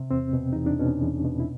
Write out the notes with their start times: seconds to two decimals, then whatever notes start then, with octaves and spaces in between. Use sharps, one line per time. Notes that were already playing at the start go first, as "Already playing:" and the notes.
Already playing: C3
0.11 E2 C4
0.33 B2
0.53 E2 D#4
0.66 D4
0.79 B2 C#4
1.01 E2
1.25 B2
1.40 E4